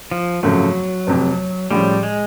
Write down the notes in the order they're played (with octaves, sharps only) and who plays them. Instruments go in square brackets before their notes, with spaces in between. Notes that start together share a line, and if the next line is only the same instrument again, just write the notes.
[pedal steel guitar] F3
[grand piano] G#1 F#2 C#3 F3 A3 [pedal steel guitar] F#3
[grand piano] F1 F2 C3
[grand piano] A2 F3 G#3 C#4 [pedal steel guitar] G3
[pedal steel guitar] G#3